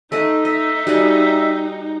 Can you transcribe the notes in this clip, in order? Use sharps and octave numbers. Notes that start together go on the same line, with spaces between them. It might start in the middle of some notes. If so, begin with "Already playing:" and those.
A3 D#4 D#5 E5 F#5
D#5 E5
G3 F#4 G#4